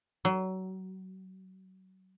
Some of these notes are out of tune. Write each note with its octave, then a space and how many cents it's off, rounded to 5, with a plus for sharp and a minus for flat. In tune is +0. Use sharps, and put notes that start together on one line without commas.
F#3 +25